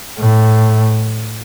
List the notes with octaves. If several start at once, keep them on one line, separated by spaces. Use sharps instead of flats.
A2